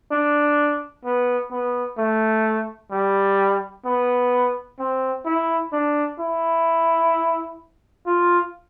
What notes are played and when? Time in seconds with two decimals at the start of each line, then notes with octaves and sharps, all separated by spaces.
0.11 D4
1.05 B3
1.52 B3
1.98 A3
2.92 G3
3.86 B3
4.79 C4
5.25 E4
5.73 D4
6.19 E4
8.06 F4